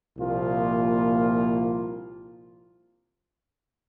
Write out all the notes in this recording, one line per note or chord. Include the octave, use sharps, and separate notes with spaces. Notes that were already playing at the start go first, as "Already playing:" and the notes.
C2 A#2 F3 A#3 F4